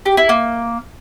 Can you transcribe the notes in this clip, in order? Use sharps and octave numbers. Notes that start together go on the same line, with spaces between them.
G4
E4
A#3